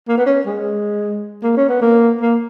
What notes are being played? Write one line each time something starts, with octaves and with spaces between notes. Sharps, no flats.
A#3
B3
C#4
G#3
A#3
C#4
B3
A#3
A#3